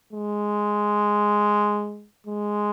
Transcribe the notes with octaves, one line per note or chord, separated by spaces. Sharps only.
G#3
G#3